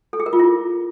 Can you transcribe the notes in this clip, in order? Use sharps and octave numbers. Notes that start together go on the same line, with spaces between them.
A4
G#4
A#4
F4
E4